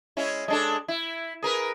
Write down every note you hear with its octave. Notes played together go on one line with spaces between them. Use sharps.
G#3 C#4 E4
G#3 D4 A4
E4
G#4 A#4 B4